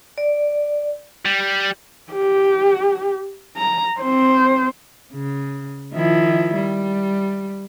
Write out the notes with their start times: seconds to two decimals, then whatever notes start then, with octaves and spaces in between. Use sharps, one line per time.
0.18 D5
1.25 G3
2.13 G4
3.57 A#5
4.00 C4 C5
5.13 C#3
5.93 D#3 F3 E4
6.54 G3